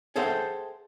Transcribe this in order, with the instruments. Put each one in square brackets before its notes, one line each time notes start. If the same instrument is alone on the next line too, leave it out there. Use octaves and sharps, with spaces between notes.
[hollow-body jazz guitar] G#4 A4 C5 E5 F#5 G5